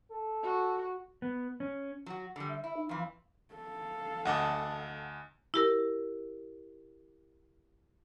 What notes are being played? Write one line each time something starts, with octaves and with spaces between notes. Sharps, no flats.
A4
F#4
B3
C#4
F#3 F#4
D3 G3
E5
E4 E5
D#4
F2 E3 F5
A4 F5
D2 D#5 F#5 A5 D6
E4 G4 A#4